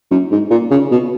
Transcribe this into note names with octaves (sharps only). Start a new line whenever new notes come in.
F#2
G#2
A#2
C#3
B2